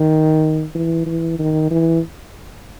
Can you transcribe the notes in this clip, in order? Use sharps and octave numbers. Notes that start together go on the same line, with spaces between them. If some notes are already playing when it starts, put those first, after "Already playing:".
Already playing: D#3
E3
E3
D#3
E3